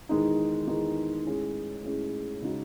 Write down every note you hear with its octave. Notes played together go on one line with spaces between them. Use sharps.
E2 D#3 G#3 D#4
E2 D#3 G#3 D#4
A2 G#3 C#4 G#4
A2 G#3 C#4 G#4
C#3 G#3 D#4 F#4